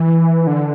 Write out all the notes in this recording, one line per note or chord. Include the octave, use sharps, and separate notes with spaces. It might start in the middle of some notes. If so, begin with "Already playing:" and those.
Already playing: E3
D3